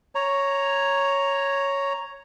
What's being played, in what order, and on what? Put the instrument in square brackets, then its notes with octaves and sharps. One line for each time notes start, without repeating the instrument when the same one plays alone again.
[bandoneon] C#5 A#5